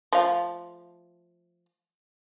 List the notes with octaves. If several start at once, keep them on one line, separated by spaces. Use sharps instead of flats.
F3 A3 F5